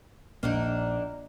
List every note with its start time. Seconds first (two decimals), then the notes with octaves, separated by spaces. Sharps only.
0.43 A#1 A#3 D4 D#4